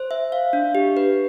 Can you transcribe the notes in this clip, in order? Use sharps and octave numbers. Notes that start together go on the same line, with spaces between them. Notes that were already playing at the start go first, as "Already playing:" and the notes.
Already playing: C5
E5
F5
D4
G4
B4